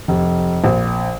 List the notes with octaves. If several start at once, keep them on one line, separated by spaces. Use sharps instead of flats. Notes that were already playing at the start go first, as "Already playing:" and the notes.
F1
A#1